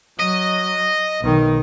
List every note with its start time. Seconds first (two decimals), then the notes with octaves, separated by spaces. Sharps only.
0.19 F#3 D#5
1.22 B1 D#3